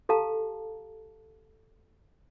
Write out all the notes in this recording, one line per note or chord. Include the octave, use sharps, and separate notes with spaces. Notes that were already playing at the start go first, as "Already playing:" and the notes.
G4 A4 F5 A5 A#5